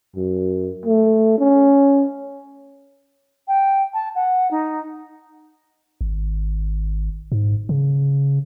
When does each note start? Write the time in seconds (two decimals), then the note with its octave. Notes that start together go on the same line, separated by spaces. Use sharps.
0.16 F#2
0.86 A3
1.38 C#4
3.47 G5
3.94 A5
4.15 F#5
4.51 D#4
6.01 G#1
7.32 G#2
7.69 C#3